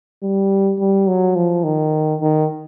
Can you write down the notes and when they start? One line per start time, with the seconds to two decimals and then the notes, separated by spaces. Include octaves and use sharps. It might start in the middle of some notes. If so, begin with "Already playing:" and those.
0.23 G3
0.79 G3
1.08 F#3
1.36 F3
1.64 D#3
2.21 D#3